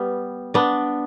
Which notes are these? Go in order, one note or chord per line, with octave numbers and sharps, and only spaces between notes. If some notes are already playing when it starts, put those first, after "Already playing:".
Already playing: G3 B3 B4
B3 D4